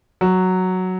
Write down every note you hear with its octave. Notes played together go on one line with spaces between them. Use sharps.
F#3